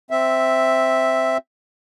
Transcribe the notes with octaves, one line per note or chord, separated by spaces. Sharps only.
C4 E5